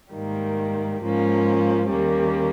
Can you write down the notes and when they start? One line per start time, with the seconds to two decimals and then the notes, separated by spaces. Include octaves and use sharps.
0.13 G#2 D#3 G3 A#3
1.01 G#2 F3 A#3 C#4
1.89 D#2 D#3 G3 A#3 C#4